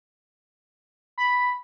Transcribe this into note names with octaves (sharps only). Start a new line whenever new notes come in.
B5